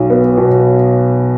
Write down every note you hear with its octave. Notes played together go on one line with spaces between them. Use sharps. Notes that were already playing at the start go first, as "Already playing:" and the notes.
Already playing: B1 F#3
B3
B2